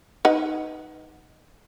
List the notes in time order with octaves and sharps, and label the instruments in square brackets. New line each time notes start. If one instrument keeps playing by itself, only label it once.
[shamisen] D#4 B4 F#5